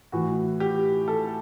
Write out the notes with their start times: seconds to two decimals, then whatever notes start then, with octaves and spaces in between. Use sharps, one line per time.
0.12 A2 E3 F#4
0.60 G4
1.08 A4